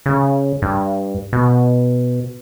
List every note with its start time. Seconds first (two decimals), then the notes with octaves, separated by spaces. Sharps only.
0.06 C#3
0.62 G2
1.33 B2